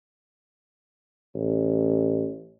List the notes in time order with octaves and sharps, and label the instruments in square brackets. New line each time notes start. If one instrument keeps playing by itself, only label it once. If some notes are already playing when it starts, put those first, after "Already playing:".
[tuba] A1